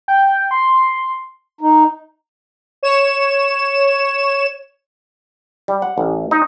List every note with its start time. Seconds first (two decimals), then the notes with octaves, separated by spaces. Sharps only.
0.08 G5
0.51 C6
1.61 D#4
2.83 C#5 E7
5.68 G3
5.82 F#5
5.98 A1
6.31 D#4